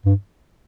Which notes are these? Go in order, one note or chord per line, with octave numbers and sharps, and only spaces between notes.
G2